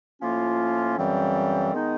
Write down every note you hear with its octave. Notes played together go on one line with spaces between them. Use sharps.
A2 F3 A#3 C#4 F4
F#2 C#3 E3 G3 C4
D#3 G#3 B3 D#4